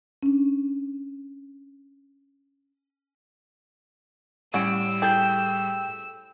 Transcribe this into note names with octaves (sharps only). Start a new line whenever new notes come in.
C#4 D4
A2 G3 C#4 F#5 E6 D7
E4 G#4 A4 G5 G6